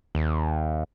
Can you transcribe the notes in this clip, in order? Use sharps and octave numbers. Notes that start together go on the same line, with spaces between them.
D#2